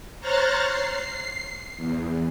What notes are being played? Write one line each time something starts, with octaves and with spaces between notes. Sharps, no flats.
C5 C#5 A#5 F6 F#6 A6
C7
E2